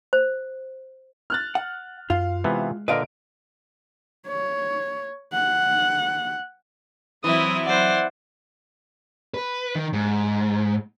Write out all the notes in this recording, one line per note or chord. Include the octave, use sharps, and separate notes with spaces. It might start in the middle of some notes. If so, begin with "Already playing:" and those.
C5
F6 F#6 A6
F#5
F#2 F4 F5
C3 E3 G#3 B3
A#2 D3 A#4 B4 D#5 F5 D7
C#5
F#5
E3 F#3 C4 E4 D#6
C5 D5 F#5
B4
D#3
G#2